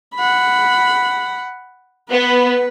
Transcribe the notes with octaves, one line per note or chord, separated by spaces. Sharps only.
F#5 B5
B3 B4